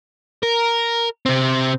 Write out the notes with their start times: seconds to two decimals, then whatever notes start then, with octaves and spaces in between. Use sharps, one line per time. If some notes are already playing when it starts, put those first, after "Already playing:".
0.43 A#4
1.26 C3 C4